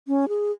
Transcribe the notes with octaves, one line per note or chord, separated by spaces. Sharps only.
C#4
G#4